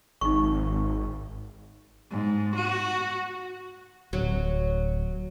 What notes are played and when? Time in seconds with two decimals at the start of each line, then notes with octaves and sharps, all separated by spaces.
0.21 G#1 D#4 C#6
2.11 G#2
2.57 F#4
4.13 D1 F#3